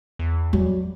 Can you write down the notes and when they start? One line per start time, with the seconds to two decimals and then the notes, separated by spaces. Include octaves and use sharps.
0.19 E2
0.53 F#3 G3